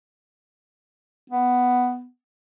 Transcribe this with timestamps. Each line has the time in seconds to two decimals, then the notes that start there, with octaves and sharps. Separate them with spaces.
1.30 B3